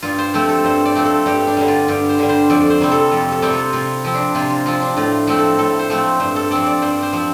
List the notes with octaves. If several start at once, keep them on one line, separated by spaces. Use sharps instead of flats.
G2 F4
C5
F3 A3 C4 C5
A4
G2 C5
D5
F3 A3 C4
A4
G2 G4
D4
D3 G3
F4
G2 G4
C5
D3 G3
C5
F2 D5
C5
C3 G3 C4
A4
F2 F4
A4
C3 G3 C4
F4
C3 F4
F3 C4
D4
C3 F4
F4
F3 C4 F4
D4
A2 F4
F3 A3 C4
A4
A2 A4
C5
F3 A3 C4
G2 C5
A4
F3 C4 D5
D5
G2 C5
C5
F3 C4